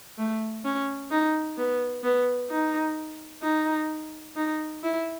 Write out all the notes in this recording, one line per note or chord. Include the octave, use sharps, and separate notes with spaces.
A3
C#4
D#4
B3
B3
D#4
D#4
D#4
E4